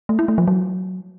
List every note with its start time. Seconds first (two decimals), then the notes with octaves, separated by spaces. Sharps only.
0.09 A3
0.19 E4
0.28 A3
0.38 F3
0.48 F#3